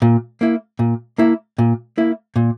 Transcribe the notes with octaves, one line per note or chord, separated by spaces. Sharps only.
A#2
A#3 E4
A#2
A#3 E4
A#2
A#3 E4
A#2